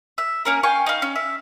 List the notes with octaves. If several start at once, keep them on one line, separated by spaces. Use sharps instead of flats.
E5
A#3 C#4 A#4
F5 G5 G#5 C#6
D#4 F5
C#4
E5